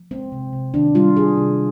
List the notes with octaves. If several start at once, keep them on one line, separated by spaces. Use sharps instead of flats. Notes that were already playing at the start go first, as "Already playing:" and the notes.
Already playing: F3
G#3 C4
C3
C3
D#3 D4
G3 F4
G3 G#4
C3